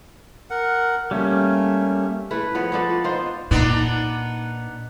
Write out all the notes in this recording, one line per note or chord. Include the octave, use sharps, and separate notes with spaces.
A#4 F#5
G3 A3 A#3 C#4
A3 E4 B4
F3 B3 C#5
F3 B3 D4 A4
B3 D#4 F4 C5
A#2 B3 D4 D#4